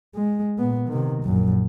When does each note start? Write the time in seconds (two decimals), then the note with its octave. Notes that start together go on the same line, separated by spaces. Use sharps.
0.15 G#3
0.59 A#2 B3
0.89 C3 D#3
1.24 A#1 F#2